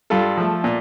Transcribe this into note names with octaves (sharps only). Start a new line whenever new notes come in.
G2 F4 A4
F3 A3
A#2